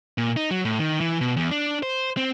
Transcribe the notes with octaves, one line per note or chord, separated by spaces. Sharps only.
A#2
D#4
F#3
A2
D#3
E3
B2
E2
D4
C5
C4